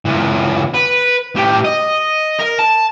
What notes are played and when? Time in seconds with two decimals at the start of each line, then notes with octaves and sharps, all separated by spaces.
0.06 C#2 E3
0.74 B4
1.36 A2 G4
1.65 D#5
2.39 A#4
2.59 A5